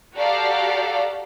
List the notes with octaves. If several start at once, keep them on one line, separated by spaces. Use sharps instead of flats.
F#4 G4 A4 D5 F5 A#5